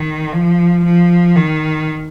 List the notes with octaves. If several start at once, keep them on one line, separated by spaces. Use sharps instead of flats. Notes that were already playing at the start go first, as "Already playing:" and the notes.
Already playing: D#3
F3
F3
D#3